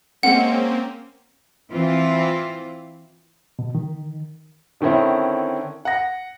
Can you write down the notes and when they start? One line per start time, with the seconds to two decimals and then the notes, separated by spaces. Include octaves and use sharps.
0.23 G#3 A#3 C4 C#4 F#5
1.71 E3 C4 E4 F4
3.59 B2
3.75 D#3
4.81 D3 D#3 C4 C#4 E4
5.85 F#5 A#6